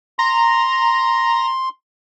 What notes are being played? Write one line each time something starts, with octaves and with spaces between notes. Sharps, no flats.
A#5 C6